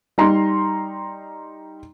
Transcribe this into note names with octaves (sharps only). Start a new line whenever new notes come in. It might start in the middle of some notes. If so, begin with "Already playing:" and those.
G3 D#4 A#5 C6